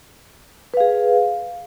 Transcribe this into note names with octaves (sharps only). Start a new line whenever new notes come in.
G#4 B4 F5